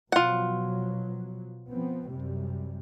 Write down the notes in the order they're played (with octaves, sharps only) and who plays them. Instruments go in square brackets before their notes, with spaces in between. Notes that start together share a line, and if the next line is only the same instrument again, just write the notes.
[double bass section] B2 F3 F#3 [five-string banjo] F4 F#5
[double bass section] F3 B3 C4
F#2 C3 G3